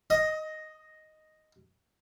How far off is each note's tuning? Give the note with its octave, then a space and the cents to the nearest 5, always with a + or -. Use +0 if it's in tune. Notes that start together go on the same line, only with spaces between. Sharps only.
D#5 +0 D#6 +30